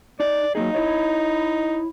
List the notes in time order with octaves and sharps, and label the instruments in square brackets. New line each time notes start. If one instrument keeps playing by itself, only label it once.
[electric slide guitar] D#4 [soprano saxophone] D5
[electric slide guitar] F#3 A#3 G#4 [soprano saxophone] D#4
[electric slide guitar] E4 C#5 D#5